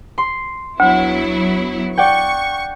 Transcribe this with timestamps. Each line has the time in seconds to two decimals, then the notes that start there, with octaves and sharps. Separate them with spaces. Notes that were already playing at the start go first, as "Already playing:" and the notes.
0.18 C6
0.80 D2 F#3 B3 E4
1.97 D5 F#5 G5 C#6